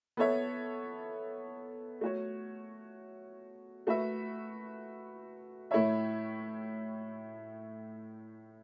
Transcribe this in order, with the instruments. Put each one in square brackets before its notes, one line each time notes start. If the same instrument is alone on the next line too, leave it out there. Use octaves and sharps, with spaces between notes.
[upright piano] B3 A4 C#5 E5
A3 F#4 C#5
A3 F#4 B4 E5
A2 A3 E4 C#5 E5